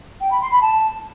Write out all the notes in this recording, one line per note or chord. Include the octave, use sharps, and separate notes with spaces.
G5
B5
C6
B5
A5